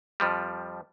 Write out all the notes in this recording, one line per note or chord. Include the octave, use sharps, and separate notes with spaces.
F2 F3 G3